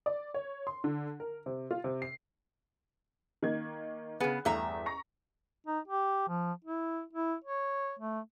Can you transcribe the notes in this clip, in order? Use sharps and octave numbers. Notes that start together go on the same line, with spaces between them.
D5
C#5
C6
D3
A#4
C3
F4
C3
C7
D#3 A#3 G#6
C#3 B3 G#4
E2 G2 A3 E5 A#5
A#5 C#6 A#6
D#4
G4
F3
E4
E4
C#5
A3